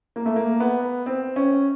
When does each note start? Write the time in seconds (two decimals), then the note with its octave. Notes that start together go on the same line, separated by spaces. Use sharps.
0.16 A#3
0.26 A3
0.36 A#3
0.60 B3
1.06 C4
1.36 C#4